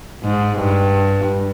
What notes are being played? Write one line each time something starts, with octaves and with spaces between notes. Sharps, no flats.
G#2
G2